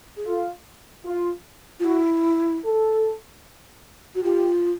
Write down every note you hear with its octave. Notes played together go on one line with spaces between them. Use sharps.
G#4
F4 A4
F4
F4
E4 F#4
A4
F#4
F4 G4